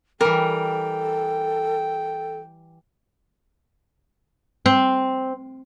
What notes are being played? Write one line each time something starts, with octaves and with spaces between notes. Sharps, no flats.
E3 G3 A4 A#4 G5
C4